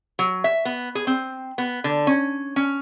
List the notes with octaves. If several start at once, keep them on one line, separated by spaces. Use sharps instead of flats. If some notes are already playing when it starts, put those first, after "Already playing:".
F#3
E5
B3
G#4
C4
B3
D3
C#4
C#4